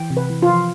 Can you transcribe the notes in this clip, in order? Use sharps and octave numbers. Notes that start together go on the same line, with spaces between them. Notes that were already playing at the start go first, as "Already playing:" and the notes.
Already playing: E3 G5
C3
B4
E3
F4
F3